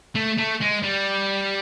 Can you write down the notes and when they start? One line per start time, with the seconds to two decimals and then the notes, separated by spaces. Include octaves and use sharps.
0.15 A3
0.38 A3
0.61 G#3
0.83 G3